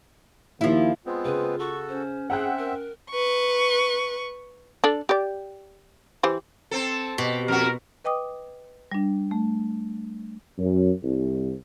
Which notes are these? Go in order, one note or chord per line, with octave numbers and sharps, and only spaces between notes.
D#2 F3 E4
G#3 B3 C4 F4
C#3 B4
F#4 A4 C#6
C#4 C5
C4 G#4 E5 F#5 G5 F#6
A#4
B4 C#6
D4 A4
G4 D5
E3 G4 C5
C4 A4
B2 G4
F2 F#4 A#4
B4 D#5 G5 D6 D#6
G3 D4
A3
F#2
C2